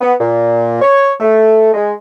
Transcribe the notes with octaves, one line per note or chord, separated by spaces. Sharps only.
B3
A#2
C#5
A3
G#3